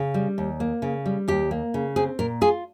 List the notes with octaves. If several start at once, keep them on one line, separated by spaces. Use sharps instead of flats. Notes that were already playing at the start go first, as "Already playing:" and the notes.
Already playing: C#3
G3
D#2
A#3
C#3
G3
D#2 G4
A#3
C#3
C4 G#4
A#2 A#4
F4 G#4